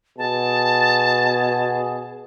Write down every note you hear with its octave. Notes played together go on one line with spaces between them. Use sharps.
B2 G#4 A5